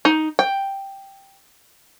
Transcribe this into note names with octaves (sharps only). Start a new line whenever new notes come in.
D#4
G5